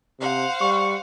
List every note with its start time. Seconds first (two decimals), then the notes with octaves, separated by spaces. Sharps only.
0.20 C3 C5 F5 F#5
0.61 G3 C#6